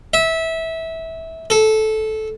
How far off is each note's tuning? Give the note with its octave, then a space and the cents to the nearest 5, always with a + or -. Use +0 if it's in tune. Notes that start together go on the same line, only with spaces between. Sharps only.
E5 -20
A4 -15